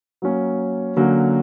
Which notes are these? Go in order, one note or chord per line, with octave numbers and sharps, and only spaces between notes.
F#3 A#3 C#4
D3 F#3 A#3 C#4